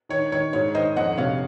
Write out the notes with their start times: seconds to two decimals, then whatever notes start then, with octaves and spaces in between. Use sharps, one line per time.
0.09 D#3 C#5
0.32 D#3 C#5
0.53 G#2 C#5
0.75 D#3 C5 D#5
0.96 F2 D#5 F#5
1.17 C3 C#5 F5